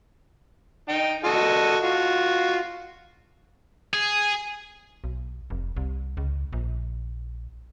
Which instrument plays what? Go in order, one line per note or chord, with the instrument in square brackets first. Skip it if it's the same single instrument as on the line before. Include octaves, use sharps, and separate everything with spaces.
[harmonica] D#4 G5
F#4 A4 D#5
F4 F#4
[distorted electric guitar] G#4
[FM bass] B1
F1
C2
C#2
A#1